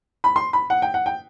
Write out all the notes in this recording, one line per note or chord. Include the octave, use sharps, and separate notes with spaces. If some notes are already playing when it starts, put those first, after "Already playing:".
B5
C6
B5
F#5
G5
F#5
G5